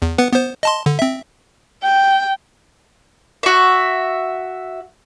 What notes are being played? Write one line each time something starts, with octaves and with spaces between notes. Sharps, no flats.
E2
B3 B4 F#5
B3 C5
D#5 A5 C6
D3
C4 E5
G5
F#4 E5